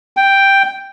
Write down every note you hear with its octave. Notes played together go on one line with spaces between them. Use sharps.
G5